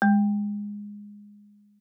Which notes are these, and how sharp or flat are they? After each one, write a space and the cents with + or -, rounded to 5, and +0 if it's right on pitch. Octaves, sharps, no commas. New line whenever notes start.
G#3 -10